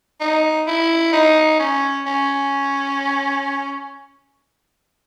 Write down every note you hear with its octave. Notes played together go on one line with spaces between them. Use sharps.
D#4
E4
D#4
C#4
C#4